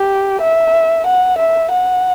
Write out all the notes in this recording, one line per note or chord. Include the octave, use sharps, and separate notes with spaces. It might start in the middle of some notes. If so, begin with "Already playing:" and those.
Already playing: G4
E5
F#5
E5
F#5